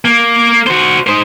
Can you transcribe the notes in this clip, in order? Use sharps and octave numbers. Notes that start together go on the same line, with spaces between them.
A#3
F#4 C5
D#4 C5